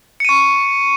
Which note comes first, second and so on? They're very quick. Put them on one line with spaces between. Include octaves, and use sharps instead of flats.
C#7 D#7 C#6